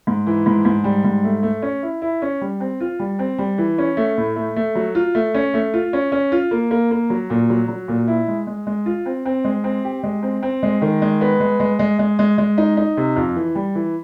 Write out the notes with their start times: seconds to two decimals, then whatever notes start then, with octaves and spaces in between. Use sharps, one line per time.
0.07 G#2
0.26 E3
0.46 G#2
0.65 G#2
0.84 G3
1.04 G#2
1.24 A3
1.43 A3
1.62 C#4
1.83 E4
2.02 E4
2.22 C#4
2.41 G3
2.60 C4
2.81 F4
2.99 G3
3.19 C4
3.38 G3
3.58 E3
3.78 C#4
3.97 A3
4.17 A2
4.36 A3
4.56 A3
4.75 F#3
4.95 F4
5.15 A3
5.34 C#4
5.54 A3
5.74 F4
5.93 C#4
6.12 C#4
6.32 F4
6.51 A#3
6.71 A#3
6.91 A#3
7.10 F#3
7.30 A#2
7.50 F#3
7.68 F#3
7.88 A#2
8.08 E4
8.28 G#3
8.47 G#3
8.67 G#3
8.86 F4
9.06 C4
9.26 C4
9.44 G#3
9.64 C4
9.85 G4
10.03 G#3
10.23 C4
10.43 C4
10.63 G#3
10.82 D#3
11.02 G#3
11.21 B3
11.40 G#3
11.60 G#3
11.79 G#3
11.99 G#3
12.19 G#3
12.38 G#3
12.58 D#4
12.77 D#4
12.97 C3
13.16 F2
13.36 E3
13.55 G3
13.75 E3